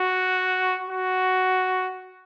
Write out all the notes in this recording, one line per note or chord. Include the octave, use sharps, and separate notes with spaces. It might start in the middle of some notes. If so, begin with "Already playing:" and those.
Already playing: F#4
F#4